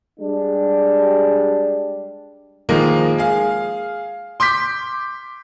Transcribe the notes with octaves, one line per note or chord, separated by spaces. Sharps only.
G3 G#3 D4
D#3 F3 G#3 A#3
G#4 F5
C6 D6 G6 B6